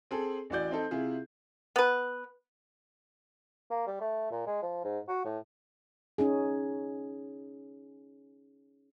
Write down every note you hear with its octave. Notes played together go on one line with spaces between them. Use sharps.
C4 G#4 A4
A1 E3 F#4 D5 G6
C4 D#4 A4
C3 E4 F4 G#4
B3 B4
A#3
G3
A3
A#2
G#3
F3
G#2
F#4
A2
C#4 D#4 G#4